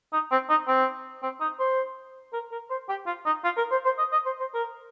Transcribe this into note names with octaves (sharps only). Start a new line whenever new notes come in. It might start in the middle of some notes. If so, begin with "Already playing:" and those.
D#4
C4
D#4
C4
C4
D#4
C5
A#4
A#4
C5
G4
F4
D#4
F4
A#4
C5
C5
D#5
D#5
C5
C5
A#4